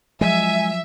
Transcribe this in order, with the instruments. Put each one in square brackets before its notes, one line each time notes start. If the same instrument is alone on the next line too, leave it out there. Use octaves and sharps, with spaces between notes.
[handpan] F3 F#3 [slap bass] G#3 [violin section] E5 [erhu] G#5